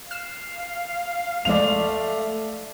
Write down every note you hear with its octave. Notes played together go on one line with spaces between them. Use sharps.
F5 F6 E7
D2 F3 G#3 A3 D5 F7